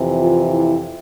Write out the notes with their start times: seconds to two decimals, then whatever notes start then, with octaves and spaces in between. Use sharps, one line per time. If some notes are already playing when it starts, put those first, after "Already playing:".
Already playing: F2 C3 E3
0.15 F4
0.48 E4